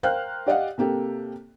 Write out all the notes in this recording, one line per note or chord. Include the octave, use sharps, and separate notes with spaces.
A#4 C5 F5 G5 F6 F#6
G4 D5 D#5 F5 F#5
C3 A#3 G4 A4